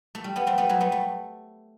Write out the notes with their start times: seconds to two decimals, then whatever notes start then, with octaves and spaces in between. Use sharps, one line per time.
0.15 A3
0.24 G3
0.36 G3 B3
0.47 A3 C4
0.58 G3 B3
0.69 F#3 A3
0.81 G3 B3
0.92 A3